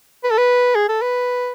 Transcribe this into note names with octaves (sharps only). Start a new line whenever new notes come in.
B4
A4
B4
G#4
A4
B4